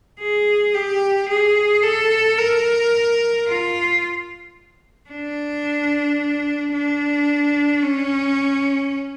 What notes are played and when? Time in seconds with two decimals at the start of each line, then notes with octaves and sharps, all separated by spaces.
0.20 G#4
0.74 G4
1.29 G#4
1.83 A4
2.38 A#4
3.47 F4
5.10 D4
6.73 D4
7.82 C#4